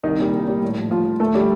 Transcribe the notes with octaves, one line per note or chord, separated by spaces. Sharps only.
C2 D#3 D#4
A#2 G3
C2
A#2 G3
A2
F3
A2 F3 F4
F3
D2 A3 A4
D3 F3 G3 G4